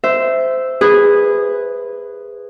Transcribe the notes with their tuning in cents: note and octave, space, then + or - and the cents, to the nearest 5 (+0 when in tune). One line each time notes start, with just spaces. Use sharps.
C5 -15 E5 +0
G#4 -20 B4 +0